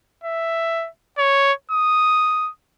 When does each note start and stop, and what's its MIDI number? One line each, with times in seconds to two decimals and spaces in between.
0.24 0.88 76
1.18 1.52 73
1.72 2.50 87